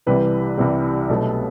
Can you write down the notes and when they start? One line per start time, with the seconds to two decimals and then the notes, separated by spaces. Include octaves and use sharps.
0.06 C2 C3 E3 G3 B4
0.58 C2 C3 E3 G3
1.09 B1 B2 A3